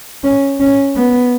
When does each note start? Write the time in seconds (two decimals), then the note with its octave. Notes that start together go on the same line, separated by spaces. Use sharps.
0.24 C#4
0.60 C#4
0.96 B3